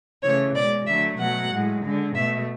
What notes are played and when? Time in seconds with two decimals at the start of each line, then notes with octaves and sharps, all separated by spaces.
0.23 C#3 E3 A3 C#5
0.55 B2 G#3 D5
0.87 D3 F#3 A3 E5
1.19 B2 F#3 A3 F#5
1.51 A2 G#3
1.83 D3 G#3
2.15 B2 A3 E5